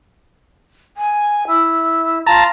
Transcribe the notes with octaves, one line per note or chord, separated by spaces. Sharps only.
G#5
E4
F4 A5 A#5